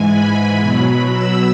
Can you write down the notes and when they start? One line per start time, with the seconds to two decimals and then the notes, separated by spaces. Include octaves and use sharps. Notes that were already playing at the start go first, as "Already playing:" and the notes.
Already playing: G#2 E3 G#3 G#5
0.09 B5
0.61 B2 F#3
1.12 E6